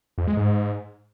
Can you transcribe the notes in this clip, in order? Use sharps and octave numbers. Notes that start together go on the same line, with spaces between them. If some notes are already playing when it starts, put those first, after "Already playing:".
F2
G#3
G#2